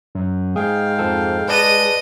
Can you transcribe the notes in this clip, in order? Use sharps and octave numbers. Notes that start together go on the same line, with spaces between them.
F#2
G#2 G#3 G#4 F5 G5
F2 F3 A4
B4 D5 D#5 A5 D#7